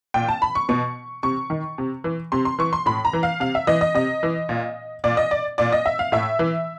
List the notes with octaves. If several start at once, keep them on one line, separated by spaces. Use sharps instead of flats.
A#2 G5
A5
B5
C#6
B2 C#6
C3 C#6
D#3
C3
E3
C3 C6
C6
E3 C#6
C6
A2 B5
A#5
E3
F5
C3 F5
E5
E3 D#5
D#5
C3 D#5
E3
A#2
A#2 D5
D#5
D5
A#2 D5
D#5
E5
F5
A2 E5
E3